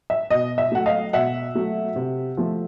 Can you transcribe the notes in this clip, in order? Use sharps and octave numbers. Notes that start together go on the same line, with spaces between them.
E5
B2 D#5
E5
F#3 A3 F#5
D#5 F5
B2 E5 F#5
F#3 A3
C3
F3 A3